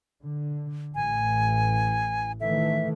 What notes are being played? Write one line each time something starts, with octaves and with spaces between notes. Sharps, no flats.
D3
A1 E3 G#5
D#3 E3 A3 E5